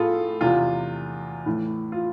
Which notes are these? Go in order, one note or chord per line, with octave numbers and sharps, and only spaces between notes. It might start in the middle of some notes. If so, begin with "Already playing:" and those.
Already playing: A2 F4 G#4 A4
E2 C3 E3 F4
A2 E3
F4